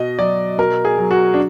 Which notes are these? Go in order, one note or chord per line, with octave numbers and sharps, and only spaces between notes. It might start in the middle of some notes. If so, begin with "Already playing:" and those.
Already playing: B2 D#5
F#3 D5
B2 A#4
G#4
F#3
F#4
D4